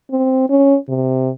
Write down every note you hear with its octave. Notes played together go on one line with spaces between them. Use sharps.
C4
C#4
C3